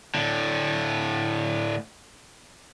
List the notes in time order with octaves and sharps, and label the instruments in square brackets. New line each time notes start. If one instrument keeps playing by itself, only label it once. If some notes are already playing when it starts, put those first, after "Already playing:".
[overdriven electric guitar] A2 D3